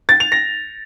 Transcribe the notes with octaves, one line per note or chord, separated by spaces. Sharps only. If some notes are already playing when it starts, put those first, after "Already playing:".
A6
F7
A#6